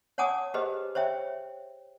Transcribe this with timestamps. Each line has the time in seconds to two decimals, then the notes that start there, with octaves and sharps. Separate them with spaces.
0.18 C#5 F#5 G#5 A5 D6 D#6
0.54 G4 G#4 B4 C5 D#5
0.95 C5 C#5 E5 G5